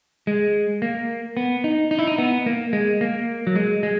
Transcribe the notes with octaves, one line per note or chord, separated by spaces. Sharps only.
G#3
A#3
B3
D#4
D#4
E4
D#4
B3
A#3
G#3
A#3
F#3
G#3
G#3